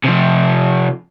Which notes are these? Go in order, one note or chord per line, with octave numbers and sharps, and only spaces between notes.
C3 F3